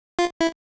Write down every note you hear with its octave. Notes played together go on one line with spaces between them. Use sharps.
F4
E4